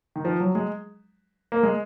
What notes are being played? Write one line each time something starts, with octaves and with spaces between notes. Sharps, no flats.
D#3
F3
F#3
G#3
A#3
G#3